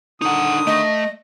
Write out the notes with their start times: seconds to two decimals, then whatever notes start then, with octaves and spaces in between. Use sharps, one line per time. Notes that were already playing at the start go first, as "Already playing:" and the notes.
0.22 D3 D#3 D#4 F#5 D#6
0.67 A3 D#5